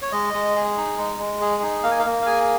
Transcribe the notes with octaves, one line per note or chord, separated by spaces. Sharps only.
C#5
G#3 D#5
G#3
G#4
D#4
G#3
G#3
G#4
D#4
A#3 F5
G#5
F5
A#3
F5
G#4 G#5